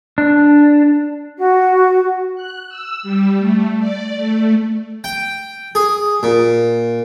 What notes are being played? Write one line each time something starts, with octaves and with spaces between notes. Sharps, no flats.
D4
F#4
F#6
E6
G3
A3
D5
A3
G5
G#4
A#2